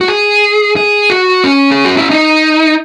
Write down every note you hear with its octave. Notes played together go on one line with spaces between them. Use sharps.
F#4
G#4
G#4
F#4
C#4
G#4
F#4
E4
D#4